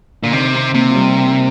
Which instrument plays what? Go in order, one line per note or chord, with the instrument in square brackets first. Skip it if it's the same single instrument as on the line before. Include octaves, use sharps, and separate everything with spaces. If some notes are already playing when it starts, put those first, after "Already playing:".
[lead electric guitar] A#2 [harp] D3
[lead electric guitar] C3 [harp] D#3
[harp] C4
[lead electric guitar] C3 [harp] A#3
[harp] F3
G3